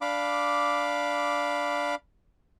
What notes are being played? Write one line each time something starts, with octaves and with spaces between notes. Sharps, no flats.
D4 F5 B5 D6